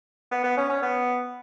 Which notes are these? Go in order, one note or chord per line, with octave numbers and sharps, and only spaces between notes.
B3
B3
C#4
C#4
B3